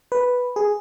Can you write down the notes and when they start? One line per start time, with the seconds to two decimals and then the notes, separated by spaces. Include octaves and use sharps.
0.12 B4
0.56 G#4